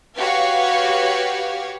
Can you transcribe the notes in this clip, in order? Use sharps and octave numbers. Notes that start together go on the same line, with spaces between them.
F#4 G4 B4 C#5 F5